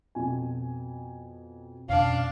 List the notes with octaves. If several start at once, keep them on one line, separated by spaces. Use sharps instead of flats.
F2 B2 G#5
F2 B2 C#4 D4 F5